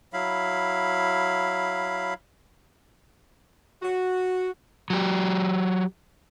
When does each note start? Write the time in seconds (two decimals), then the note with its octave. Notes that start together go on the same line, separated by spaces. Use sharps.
0.13 F#3 E4 F5 B5
3.82 F#4
4.90 F#3 G4